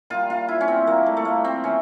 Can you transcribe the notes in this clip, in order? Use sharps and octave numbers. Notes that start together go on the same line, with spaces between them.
A#2 G3 F4
F4
E4
C#4
C4
A#2 G3 A#3
A3
A3
A#3
C4
E3 C#4